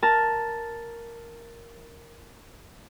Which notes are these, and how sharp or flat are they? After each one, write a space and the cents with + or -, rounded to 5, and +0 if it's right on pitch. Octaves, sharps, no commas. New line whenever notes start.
A#4 +0 A5 +0